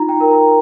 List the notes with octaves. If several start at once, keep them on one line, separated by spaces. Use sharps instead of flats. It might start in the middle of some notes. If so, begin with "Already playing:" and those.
Already playing: D#4 F4 A#5
G5
A#4
A#5